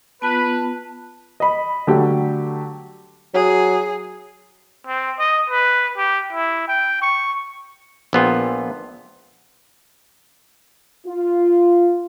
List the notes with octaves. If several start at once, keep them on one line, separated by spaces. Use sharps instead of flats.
B3 F4 B4 A5
D#5 B5
D3 F#3 G3 A3 G4
F#3 G#4
C4
D#5
B4
G4
E4
G5
C#6
A#1 B3 F4 G5
F4